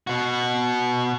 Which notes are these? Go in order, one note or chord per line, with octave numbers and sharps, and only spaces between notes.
B2 F#4